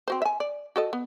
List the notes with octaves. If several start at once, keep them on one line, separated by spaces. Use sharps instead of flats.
C4 F#4 C5
E5 G#5
D5
F#4 A4 D#5
B3